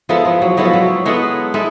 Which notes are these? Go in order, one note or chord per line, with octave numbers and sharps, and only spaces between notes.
F3 G#3 B3 E4 A4
F3
F#3
F#3 G#3 B3 E4 A4
F3
F#3
G#3 B3 E4 A4
G#3 E4 A4